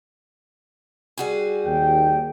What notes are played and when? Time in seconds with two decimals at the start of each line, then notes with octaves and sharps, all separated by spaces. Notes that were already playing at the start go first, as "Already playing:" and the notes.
1.18 G3 F#4 G#4
1.65 D#2 G5